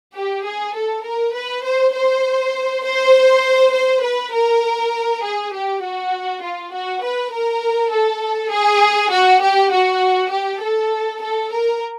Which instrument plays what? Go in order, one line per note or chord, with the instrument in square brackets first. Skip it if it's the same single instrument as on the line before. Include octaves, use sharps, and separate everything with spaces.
[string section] G4
G#4
A4
A#4
B4
C5
C5
C5
C5
B4
A#4
G#4
G4
F#4
F4
F#4
B4
A#4
A4
G#4
F#4
G4
F#4
G4
A4
A4
A#4